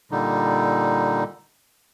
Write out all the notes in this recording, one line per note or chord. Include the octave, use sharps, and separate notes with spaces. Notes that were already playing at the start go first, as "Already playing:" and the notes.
A#2 D3 G3 D#4